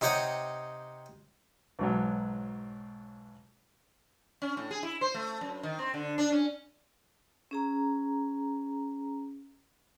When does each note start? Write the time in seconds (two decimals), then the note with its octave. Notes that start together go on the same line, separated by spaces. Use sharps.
0.01 C3 D#4 G4 C#5 D#5 F#5
1.79 B1 G#2 F#3
4.42 C#4
4.57 A2
4.71 G#4
4.83 E4
5.01 C5
5.14 A3
5.41 F#2
5.63 D#3
5.79 C4
5.94 D3
6.18 D4
6.31 C#4
7.51 C#4 G#4 A#5